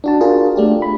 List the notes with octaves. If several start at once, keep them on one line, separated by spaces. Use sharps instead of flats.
D4 F#4 A5
D4 F4 F#4 G#4 A#4
A3 D4 G4
B5